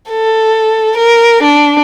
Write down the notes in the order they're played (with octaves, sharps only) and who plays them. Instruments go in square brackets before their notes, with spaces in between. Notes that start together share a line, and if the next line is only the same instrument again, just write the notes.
[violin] A4
A#4
D4